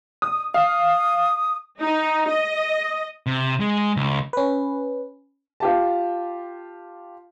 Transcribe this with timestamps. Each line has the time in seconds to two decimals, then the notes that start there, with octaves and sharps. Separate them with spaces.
0.22 D#6
0.54 F5 D#6
1.80 D#4
2.28 D#5
3.26 C3
3.60 G#3
3.97 C#2
4.33 C#4 B4
5.60 F4 G4 A5